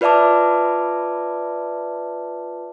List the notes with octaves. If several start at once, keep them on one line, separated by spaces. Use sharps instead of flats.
F4 B4 D5 E5 A5 D6